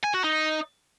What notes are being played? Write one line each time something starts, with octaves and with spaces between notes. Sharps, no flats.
G#5
F#4
D#4